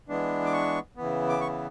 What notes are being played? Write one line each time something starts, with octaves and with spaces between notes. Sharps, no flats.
E3 G#3 B3 D4
D6
C#6
C#3 E3 B3
D6
C#6